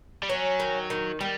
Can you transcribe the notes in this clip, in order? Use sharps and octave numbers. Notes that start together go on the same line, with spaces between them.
G3
F#3 C#4
D#3
D#3
D#3 G3